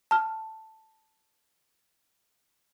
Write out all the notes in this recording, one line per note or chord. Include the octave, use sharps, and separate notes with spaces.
A5 F6